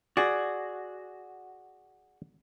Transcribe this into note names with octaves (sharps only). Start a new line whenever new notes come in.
F#4 G#4 D5